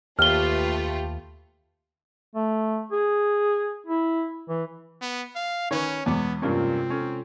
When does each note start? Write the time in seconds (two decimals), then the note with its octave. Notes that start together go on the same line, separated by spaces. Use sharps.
0.19 D#2 A3 F4 G4 B4 F6 G7
2.35 A3
2.92 G#4
3.87 E4
4.49 E3
5.01 B3
5.35 F5
5.71 D#3 C#4 B4 C#5
6.06 E2 B2 G#3 B3 D6
6.42 G2 C3 A#3 C4 C#4 F4
6.90 C#4 A4